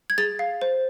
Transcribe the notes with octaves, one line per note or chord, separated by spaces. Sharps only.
G#6
G#4 A6
F5
C5